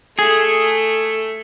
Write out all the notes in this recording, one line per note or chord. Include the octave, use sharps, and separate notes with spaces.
A3 G#4